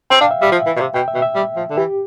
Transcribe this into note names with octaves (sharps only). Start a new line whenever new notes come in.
C4 G5
D4 F5
E5
G3 E5
F3
E3
B2
C3
B2 G5
E5
B2
E5
G3
F3
D3
E3 G4